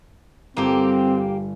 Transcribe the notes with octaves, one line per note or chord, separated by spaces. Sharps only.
G1 A#3 C4 G4